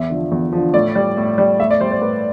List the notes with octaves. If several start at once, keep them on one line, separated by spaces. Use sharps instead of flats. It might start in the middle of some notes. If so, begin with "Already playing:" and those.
Already playing: E2 E5
D3 F3
E2
D3 F3
A2 D5
G3
A2
G3
A2 E5
D5
G3 C5
C5
A2 B4